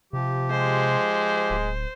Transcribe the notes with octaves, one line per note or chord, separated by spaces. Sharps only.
C3 F3 G4
G#3 C5
D1